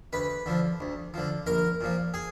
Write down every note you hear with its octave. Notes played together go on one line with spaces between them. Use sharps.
D2 B4
D3 F3
D2
D3 F3
A#1 A#4
A#2 F3
G#4